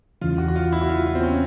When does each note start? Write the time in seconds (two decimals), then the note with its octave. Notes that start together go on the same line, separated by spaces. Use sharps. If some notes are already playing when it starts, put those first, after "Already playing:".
0.21 E2 C#3 E3 F4
0.38 F#4
0.48 F#4
0.56 F4
0.72 E4
0.82 F#4
0.89 F4
1.06 F4
1.15 C4
1.23 C#4